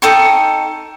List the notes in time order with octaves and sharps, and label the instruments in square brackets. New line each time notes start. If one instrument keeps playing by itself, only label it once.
[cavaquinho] D#4 A4 G5 C#6